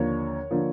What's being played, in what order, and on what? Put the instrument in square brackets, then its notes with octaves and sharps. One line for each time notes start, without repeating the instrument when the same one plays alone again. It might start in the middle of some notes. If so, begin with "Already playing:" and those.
Already playing: [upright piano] D#2 D3 F3 A#3 C#5
D3 F3 A#3